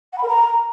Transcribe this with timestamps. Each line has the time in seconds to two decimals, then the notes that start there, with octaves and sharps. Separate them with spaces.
0.12 F#5
0.17 B5
0.23 A#4
0.28 A#5